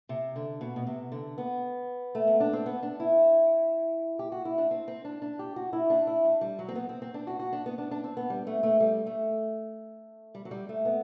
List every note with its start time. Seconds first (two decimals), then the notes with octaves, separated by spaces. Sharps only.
0.09 C3
0.36 D3
0.61 B2
0.76 B2
0.87 C3
1.12 D3
1.38 B3
2.15 A3
2.27 B3
2.40 D4
2.53 C4
2.66 B3
2.83 D4
3.00 E4
4.19 G4
4.32 F#4
4.45 E4
4.58 D4
4.71 C4
4.88 C4
5.05 D4
5.22 D4
5.39 G4
5.56 F#4
5.73 E4
5.90 D4
6.07 E4
6.25 D4
6.41 G3
6.59 F#3
6.68 C4
6.75 B3
6.89 C4
7.02 C4
7.14 D4
7.27 F#4
7.39 F#4
7.53 D4
7.66 B3
7.78 D4
7.91 D4
8.04 C4
8.17 B3
8.30 G3
8.47 A3
8.63 A3
8.80 G3
9.06 A3
10.35 G3
10.45 F#3
10.51 G3
10.69 A3
10.85 B3